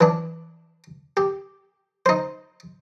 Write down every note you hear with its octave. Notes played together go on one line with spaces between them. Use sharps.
E3 D4
G4
D#4 C5